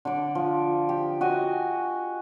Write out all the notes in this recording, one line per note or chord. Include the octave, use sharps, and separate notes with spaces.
D3 D5
F3
G4
F#4 D#5 G#5